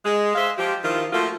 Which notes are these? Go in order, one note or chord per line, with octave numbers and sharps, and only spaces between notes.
G#3
G#3 C5 E5 F5
F3 G4
D#3 F3 E4 F4
F3 A3 A#3 F4 F#4